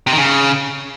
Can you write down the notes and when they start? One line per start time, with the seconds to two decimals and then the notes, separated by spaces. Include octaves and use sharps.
0.07 C3
0.12 D#3
0.18 C#3